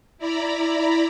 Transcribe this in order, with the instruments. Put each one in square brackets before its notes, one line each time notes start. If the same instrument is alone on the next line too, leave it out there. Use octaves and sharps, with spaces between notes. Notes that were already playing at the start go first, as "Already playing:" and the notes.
[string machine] E4 D5 A#5 B5